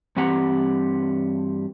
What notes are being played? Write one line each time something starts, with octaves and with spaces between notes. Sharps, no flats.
G2 E3 C4 G4 F#5 A#5